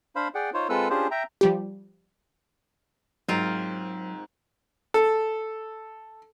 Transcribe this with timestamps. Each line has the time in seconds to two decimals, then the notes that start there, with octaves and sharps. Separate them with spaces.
0.16 D4 C5 F5 B5
0.35 G#4 D5 F#5 G5
0.54 D#4 F4 C5 C#5
0.69 G#3 C4 F4 A4 B4 E6
0.90 C#4 D4 F4 G4 G#4 C5
1.11 E5 G5 A#5
1.41 F3 G3 G4
3.29 G#2 F#3 C4 F4 A#4
4.94 A4